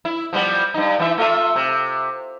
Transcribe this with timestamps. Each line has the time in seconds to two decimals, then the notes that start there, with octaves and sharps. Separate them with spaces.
0.05 E4
0.33 F3 G3 B3
0.74 G2 D#4
0.99 E3 E5
1.18 A3 F4 E5
1.56 C3